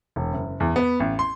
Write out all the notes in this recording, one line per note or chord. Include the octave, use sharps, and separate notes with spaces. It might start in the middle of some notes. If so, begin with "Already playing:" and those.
E1
F#1
E2
B3
A1
C6